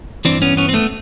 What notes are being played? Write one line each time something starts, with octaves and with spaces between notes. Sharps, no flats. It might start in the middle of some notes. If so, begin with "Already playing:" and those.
G2 E3 C4 D4
B3 C#4
B3 C#4
C4
A3 B3